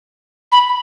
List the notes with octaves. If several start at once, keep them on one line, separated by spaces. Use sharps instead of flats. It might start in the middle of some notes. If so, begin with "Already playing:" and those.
B5